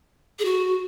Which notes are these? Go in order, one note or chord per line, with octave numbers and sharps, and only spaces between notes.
G#4
F#4